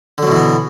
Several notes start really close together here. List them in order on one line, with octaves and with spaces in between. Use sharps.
D3 F#3 B2 E3 B3